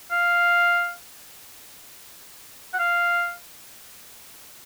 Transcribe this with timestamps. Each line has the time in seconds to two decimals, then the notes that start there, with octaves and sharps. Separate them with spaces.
0.11 F5
2.74 F#5
2.79 F5